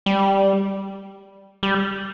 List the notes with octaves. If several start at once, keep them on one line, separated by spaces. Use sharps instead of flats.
G3
G3